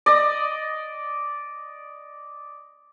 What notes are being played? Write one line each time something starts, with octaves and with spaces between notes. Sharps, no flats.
D5 D#5